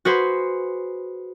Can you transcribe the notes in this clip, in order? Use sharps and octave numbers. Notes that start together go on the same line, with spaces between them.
F#4 G#4 B4 C5